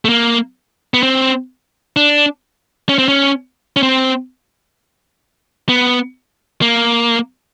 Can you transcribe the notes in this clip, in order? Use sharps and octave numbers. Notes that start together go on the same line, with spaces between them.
A3
A#3
B3
C4
D4
C#4
C4
C#4
C#4
C4
B3
A#3